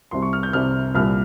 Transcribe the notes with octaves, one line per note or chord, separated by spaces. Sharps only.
C2 C3 G3 C6
C#6
F6
G6
C2 C3 G3 F6
C2 A#2 G3 F6